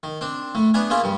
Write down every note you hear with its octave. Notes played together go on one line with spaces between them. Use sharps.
D#3
C4 D4
A2 A3
B3 D4 E4 G#4
A#3 C#4 E4 F4 G#4
G2 G3